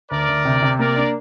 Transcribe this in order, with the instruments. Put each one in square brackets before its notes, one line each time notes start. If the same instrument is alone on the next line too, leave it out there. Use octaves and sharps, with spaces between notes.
[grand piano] D2 [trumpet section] A#4 D5
[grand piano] D2
C3
C3
[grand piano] A#3 [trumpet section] A#4 D5
[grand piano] D4